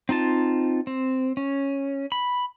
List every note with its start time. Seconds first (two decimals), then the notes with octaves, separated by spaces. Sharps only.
0.09 C4 D#4 F4 A5
0.87 C4
1.37 C#4
2.12 B5